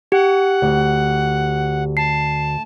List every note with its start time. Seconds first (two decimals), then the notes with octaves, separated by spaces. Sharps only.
0.12 G4 F#5
0.62 D2
1.97 A5 C7